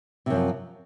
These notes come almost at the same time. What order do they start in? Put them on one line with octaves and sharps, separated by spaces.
C3 F#2 F3